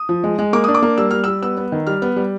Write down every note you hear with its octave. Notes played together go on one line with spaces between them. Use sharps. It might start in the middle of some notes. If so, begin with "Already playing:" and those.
Already playing: D#6
F3
G#3
G#3
A#3 D6
D4 D#6
D6
A#3
G3 E6
G3 F6
G3 E6
B3 E6
B3
D#3
G3 F6
B3
G3